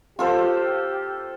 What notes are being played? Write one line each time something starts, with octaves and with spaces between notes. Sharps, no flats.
F4 G4 A4 C5